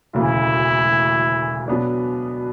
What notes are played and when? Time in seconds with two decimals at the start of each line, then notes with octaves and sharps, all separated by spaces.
0.14 E1 D2 C#3 E3 E4
1.68 B2 F#3 B3 D4